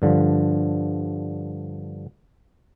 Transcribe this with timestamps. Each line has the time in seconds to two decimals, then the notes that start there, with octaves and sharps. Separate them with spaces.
0.02 G2 D3 F3